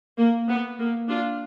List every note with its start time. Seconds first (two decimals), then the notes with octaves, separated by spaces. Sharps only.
0.19 A#3
0.49 B3
0.79 A#3
1.09 D4 F4